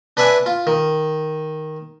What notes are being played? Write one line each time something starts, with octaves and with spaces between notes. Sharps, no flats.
D4 B4 D5 E5 G#5
F4
D#3